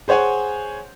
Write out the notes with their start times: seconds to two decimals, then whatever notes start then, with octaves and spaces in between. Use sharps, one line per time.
0.08 G#4 C5 C#5 F#5 G#5